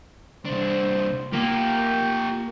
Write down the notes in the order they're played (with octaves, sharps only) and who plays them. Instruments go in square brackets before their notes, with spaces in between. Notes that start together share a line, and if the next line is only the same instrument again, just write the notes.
[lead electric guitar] C2 D4 [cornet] C5
[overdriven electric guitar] A#3 [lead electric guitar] F4 G4 [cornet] G5